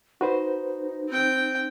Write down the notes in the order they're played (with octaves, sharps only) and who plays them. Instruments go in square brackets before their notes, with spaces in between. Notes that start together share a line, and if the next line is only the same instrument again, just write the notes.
[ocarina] D#4 [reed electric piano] F#4 B4 C5
[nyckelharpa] C4 G5